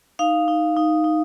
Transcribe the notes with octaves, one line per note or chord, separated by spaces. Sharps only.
D#4 F5
D#4
D#4
D#4